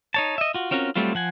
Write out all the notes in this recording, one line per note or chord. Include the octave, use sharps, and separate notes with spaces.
D#4 C#5 A5
D#5 E5
F4 F#4
C4 C#4 F4 F#4 A#4
F#3 G3 A3 C4 F4
F3 F#5 G#5